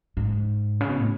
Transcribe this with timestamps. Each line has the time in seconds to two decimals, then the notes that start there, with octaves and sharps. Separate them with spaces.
0.17 G#2
0.81 C#3
0.89 B2
0.97 A2